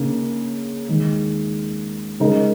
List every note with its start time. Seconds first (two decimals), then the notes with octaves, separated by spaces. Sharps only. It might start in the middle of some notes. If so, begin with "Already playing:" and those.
Already playing: C#3 A#3 D#4
0.89 D#2 D#3 G#3
2.20 C#3 G#3 D#4 A#4